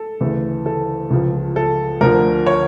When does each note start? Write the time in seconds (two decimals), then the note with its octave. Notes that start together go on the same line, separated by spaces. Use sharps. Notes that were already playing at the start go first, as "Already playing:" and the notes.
Already playing: A4
0.20 D2 C#3 E3 A3
0.66 A4
1.11 C#2 C#3 F3
1.56 A4
2.01 D2 D3 F3 A#4
2.46 C#5